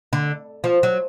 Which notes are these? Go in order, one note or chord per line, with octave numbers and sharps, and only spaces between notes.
D3
F3
F#3